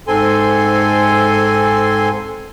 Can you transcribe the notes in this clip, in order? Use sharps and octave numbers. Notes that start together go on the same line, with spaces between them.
G#2 C4 A4 G#5 C6